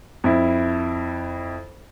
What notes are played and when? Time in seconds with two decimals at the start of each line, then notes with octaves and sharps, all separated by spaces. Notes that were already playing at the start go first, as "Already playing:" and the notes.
0.24 F2 E4